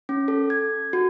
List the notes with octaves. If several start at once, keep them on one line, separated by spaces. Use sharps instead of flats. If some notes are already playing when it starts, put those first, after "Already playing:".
C#4
A4
G#6
F#4